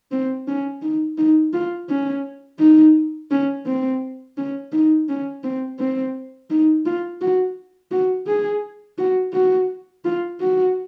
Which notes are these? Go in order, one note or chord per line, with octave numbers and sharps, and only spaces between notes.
C4
C#4
D#4
D#4
F4
C#4
D#4
C#4
C4
C#4
D#4
C#4
C4
C4
D#4
F4
F#4
F#4
G#4
F#4
F#4
F4
F#4